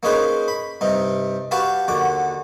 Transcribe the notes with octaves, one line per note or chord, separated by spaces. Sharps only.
A#3 C#4 D#4 G#4 B4 C5
B5
G2 C3 D#4
F#4 G4 B4 F5 G5 A5
D#2 D3 F#4 D6